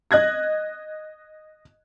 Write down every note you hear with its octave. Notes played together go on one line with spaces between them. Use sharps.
D#5 F#6 G#6 A#6